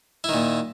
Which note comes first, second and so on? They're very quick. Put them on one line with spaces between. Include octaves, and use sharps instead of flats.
E4 D#3 A#2